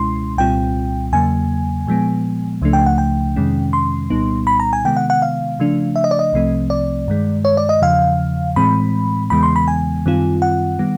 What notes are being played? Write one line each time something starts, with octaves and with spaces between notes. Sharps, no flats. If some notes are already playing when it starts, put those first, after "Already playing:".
Already playing: C#2 B2 G#3 C#4 E4 C6
C2 A#2 G3 C4 F4 G5
E2 C#3 F#3 A#3 G#5
A#2 F3 G#3 B3
C#2 C#3 F3 A3 D4
G5
F#5
G5
F2 C3 D#3 G#3 C#4
C6
C2 A#2 G3 B3 D#4
B5
A#5
G#5
C3 D#3 G#3 B3 G5
F#5
F#5
F5
C#3 F3 A3 D4
E5
D#5
D5
D#5
C2 C3 F3 A3 C4
D5
G2 D#3 G#3
C#5
D5
D#5
E2 C#3 F3 F5
A2 E3 G#3 C4 B5
E2 C#3 E3 G#3 B3 B5
C6
B5
G#5
F#2 D#3 G3 C4 F4
F#5
D#3 G3 B3